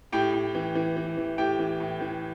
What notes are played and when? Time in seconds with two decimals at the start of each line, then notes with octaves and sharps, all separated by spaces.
0.12 A2 G4 G5
0.34 A2
0.55 E3
0.75 E3
0.97 E3
1.17 E3
1.38 A2 G4 G5
1.59 E3
1.80 A2
2.00 E3